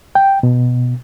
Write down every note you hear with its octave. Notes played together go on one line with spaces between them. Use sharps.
G5
B2